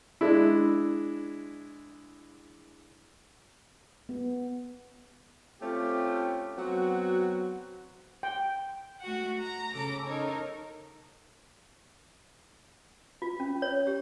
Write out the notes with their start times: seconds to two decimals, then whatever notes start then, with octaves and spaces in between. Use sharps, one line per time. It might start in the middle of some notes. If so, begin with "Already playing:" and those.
0.21 G#3 D4 E4
4.09 B3
5.61 A3 C4 C#4 F4 G4
6.58 F#3 B3 C4 F#4
8.23 G5
9.02 A3 F#4 F#5
9.40 A#5 A#6
9.74 C#3 C#4 A4 A#5 D6
10.07 D#4 A4 A#4 C#5
13.22 F4
13.40 C#4
13.62 C#5
13.87 G4